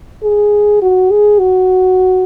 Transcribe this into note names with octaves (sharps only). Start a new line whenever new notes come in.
G#4
F#4
G#4
F#4